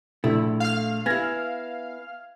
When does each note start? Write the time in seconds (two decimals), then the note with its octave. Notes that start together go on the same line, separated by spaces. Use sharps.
0.24 A#1 A3 E4
0.60 F5 F6
1.06 B3 E4 G#5 G#6 A#6